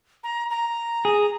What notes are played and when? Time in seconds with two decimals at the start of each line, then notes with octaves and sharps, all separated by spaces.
0.24 A#5
0.50 A#5
1.05 G#4